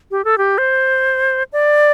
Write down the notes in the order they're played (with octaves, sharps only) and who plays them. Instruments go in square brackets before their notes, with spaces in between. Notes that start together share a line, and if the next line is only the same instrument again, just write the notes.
[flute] G4
A4
G4
C5
D5